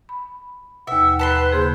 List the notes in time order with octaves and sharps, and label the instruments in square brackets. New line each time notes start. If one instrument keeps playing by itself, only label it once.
[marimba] B5
[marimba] D#2 B2 [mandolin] E5 [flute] F#5
[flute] B4 [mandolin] A5 B5 C6
[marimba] C#3 A#3 G#4 [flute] C5